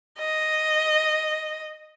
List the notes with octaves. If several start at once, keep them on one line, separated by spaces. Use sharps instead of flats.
D#5